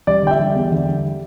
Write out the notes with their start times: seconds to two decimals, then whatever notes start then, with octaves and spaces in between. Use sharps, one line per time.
0.07 G3 D5
0.22 D3 G5
0.31 E5
0.40 G3
0.55 E2
0.71 D3
0.87 G3